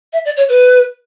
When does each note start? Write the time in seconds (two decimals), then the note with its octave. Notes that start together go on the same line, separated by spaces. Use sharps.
0.13 E5
0.25 D5
0.37 C#5
0.49 B4